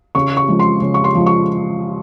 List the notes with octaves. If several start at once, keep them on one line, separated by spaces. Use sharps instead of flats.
C#3 C#6
C#6
F3 G#3
C6
C#3
C#6
C6
F3 G#3
C#6